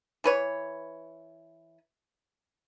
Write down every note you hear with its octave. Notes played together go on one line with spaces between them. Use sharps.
E3 B4 C#5